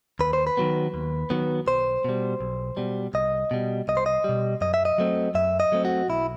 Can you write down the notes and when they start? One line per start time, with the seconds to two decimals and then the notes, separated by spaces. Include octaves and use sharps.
0.19 D#2 B4
0.33 C5
0.47 B4
0.57 D#3 F#3 B3
0.94 D#2
1.30 D#3 F#3 B3
1.67 B1 C5
2.05 B2 G3
2.41 B1
2.77 B2 G3
3.14 C2 D#5
3.51 B2 G3
3.88 C2 D#5
3.97 C5
4.06 D#5
4.24 B2 G3
4.61 F#2 D#5
4.74 E5
4.85 D#5
4.98 F#3 A3 C4
5.35 F#2 E5
5.60 D#5
5.72 F#3 A3 C4
5.85 F#4
6.09 B1 E4